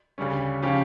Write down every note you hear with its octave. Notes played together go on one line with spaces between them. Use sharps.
D2 C#3 G3 C#4
C#3 F3 C#4 G4